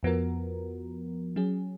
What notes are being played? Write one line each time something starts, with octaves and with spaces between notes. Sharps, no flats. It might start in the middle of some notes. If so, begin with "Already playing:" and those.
F2 F3 B3 F#4 A#4
F#3 C#4 G#4